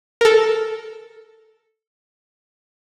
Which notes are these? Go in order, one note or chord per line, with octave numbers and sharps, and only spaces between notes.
A4 A#4